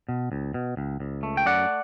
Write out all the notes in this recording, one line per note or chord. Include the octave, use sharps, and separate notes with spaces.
B2
C#2
B2
C#2
C#2
A3
G5
F#2 D5 F#5